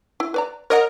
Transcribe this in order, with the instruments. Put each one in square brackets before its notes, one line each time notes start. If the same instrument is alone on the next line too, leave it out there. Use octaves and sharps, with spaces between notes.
[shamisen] E4
B4 D5 A#5
[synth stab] A#4 [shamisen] C#5 D#5 F#5